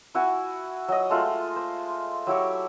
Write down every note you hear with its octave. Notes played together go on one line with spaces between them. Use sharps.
E4 F#4 F#5 G#5
F#3 D#5
G#3 A3 F4
C5
F#3 E4 G4 C#6